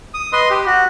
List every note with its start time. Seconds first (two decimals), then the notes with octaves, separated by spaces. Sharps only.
0.14 D#6
0.33 B4 D#5 C6
0.50 G4
0.66 F#4